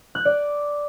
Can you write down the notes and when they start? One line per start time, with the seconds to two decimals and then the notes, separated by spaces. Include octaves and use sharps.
0.15 F#6
0.20 G6
0.25 D5